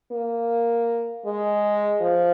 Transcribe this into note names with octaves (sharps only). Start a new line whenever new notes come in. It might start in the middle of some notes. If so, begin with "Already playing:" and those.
A#3
G#3
F3